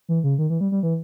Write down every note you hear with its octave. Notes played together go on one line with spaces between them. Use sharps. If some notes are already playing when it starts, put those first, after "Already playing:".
E3
C#3
D#3
E3
G3
G3
E3